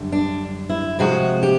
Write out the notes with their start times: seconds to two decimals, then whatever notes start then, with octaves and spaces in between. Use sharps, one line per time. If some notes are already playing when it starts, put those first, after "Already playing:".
Already playing: F#2 D3 G3
0.12 D4
0.69 E4
0.99 C3 F3 G#3 F#4
1.43 G4